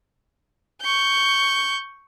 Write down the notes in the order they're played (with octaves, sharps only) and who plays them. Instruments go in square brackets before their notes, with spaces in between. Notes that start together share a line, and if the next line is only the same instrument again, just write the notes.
[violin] C#6 G6